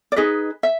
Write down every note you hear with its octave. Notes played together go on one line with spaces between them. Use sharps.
D5
D#4 G#4 B4 D#5
E5